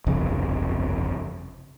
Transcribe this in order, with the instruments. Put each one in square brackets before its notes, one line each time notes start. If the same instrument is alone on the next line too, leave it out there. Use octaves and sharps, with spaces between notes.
[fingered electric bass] G1 C2 F2 C#3